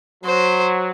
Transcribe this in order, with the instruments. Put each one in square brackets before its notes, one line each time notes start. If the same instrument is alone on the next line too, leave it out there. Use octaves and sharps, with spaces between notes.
[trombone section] F#3 [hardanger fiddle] C5